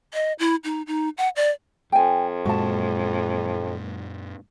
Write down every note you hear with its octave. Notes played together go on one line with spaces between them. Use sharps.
D#5
E4
D#4
D#4
F#5
D5
F2 G5 G#5
F#2 A#2 G#3 F#4 A5